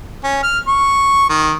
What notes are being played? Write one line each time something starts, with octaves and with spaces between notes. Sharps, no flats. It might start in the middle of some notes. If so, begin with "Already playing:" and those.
C#4
F6
C#6
D#3